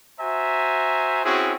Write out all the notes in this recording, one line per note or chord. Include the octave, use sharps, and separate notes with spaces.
F#4 C5 E5 G#5 A#5
C4 C#4 E4 F#4 G#4